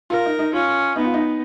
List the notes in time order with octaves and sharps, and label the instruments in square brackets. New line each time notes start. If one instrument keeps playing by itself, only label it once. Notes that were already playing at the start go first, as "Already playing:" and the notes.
[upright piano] F4 [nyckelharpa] A#4
[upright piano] D#4
D#4
[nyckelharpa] C#4 [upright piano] F4
[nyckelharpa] B3 [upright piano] D#4
[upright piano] F4
D#4